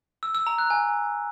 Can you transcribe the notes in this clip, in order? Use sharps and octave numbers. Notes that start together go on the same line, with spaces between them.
E6
E6
A#5
F#6
G#5